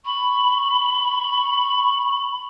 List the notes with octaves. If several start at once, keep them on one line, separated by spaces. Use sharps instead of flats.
B5 C#6